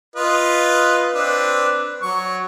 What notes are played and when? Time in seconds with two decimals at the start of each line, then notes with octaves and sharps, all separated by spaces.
0.16 F4 B4 D#5
1.14 C4 D4 B4
2.02 F#3 C#6